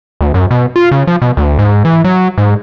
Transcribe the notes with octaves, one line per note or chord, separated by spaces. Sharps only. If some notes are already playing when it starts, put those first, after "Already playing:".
D2
F#2
B2
F4
C#3
F3
B2
D2
G#2
E3
F#3
G#2